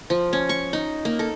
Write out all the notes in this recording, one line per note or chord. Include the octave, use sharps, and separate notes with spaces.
F3
C#4
C#6
D#4
A#3
A4